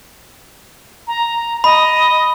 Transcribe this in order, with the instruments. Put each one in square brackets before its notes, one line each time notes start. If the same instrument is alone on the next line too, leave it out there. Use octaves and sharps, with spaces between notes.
[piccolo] A#5
[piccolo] D#5 [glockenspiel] B5